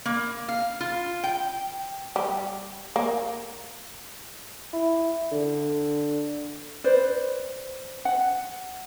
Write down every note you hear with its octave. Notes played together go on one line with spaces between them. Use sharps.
A#3
F5
F4
G5
G3
A#3
E4
D3
B4 C5 D5
F#5